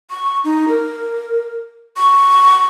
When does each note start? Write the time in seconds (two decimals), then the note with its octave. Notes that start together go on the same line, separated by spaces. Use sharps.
0.10 C#6
0.44 D#4
0.68 A#4
1.97 C#6